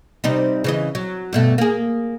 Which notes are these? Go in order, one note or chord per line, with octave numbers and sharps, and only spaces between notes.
C3 G3 D#4
C#3 E3 D#5
F#3
G2 B2 A3
A#3 G#4